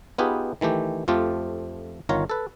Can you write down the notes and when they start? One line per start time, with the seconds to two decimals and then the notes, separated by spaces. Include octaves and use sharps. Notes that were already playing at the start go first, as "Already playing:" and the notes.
0.18 B3 D#4 F4 G4 G#4 B4
0.61 D#3 E3 A3 G4
1.08 F2 F3 A3 F4 G4
2.09 G1 D#3 F4 C#5 A#5
2.30 A4 B4